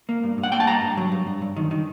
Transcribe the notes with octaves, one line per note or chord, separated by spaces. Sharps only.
A#3
G2
G2
F#5
A#3 G5
A5
G2 A#5
G2
F#3
G2
G2
G2
D#3
D#3